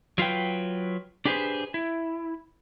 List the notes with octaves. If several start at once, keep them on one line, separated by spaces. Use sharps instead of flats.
F#3 F4 B4 G5
D4 G4 G#4 B4 C5
E4